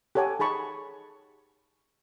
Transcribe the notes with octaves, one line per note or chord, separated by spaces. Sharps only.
G4 A4 C#5 F#5 G#5 D6
D#4 G#4 A5 B5 C#6